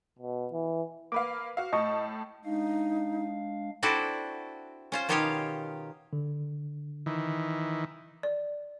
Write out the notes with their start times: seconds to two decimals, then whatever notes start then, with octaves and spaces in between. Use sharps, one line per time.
0.19 B2
0.52 E3
1.12 A#3 B4 F5 D6
1.57 F#4 F5
1.73 A2 D#5 A5 C#6
2.45 G#3 D4 D#4 F5
3.83 C4 D4 E4 F#4 A4 D5
4.92 C#4 F4 C5
5.09 B2 D#3 F4 G4 C#5 F5
6.13 D3
7.06 D#3 E3
8.23 D5